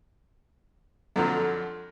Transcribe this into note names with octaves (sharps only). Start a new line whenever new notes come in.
F2 D3 F3 F#3